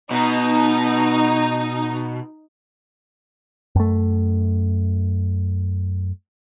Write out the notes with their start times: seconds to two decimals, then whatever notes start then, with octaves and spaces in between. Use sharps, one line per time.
0.11 B2 D#4
3.76 F#2 A3